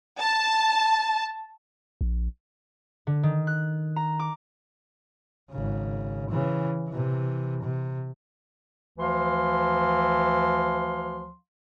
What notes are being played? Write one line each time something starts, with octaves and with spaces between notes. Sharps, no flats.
A5
A#1
D3
D#3
F#6
A#5
D6
G#1 C#3
C#3 E3
C3 E3
C3
D2 E3 F3 F5 C6